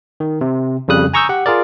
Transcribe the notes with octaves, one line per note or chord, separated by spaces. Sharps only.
D#3
C3
F2 C#3 G3 D#6 F#6
G#5 A#5 C#6 D#6 E6 G6
G4 F#5
F4 G#4 A#4 D5